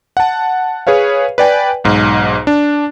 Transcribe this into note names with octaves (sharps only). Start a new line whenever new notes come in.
F#5 A5
G#4 B4 C#5 F5
B4 D5 G5 G#5
B1 G#2
D4